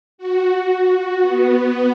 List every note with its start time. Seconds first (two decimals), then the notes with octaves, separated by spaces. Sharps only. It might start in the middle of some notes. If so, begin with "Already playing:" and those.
0.18 F#4
1.21 B3